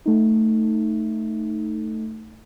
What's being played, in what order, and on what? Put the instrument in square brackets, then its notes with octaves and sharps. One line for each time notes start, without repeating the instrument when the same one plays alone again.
[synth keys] A3 D#4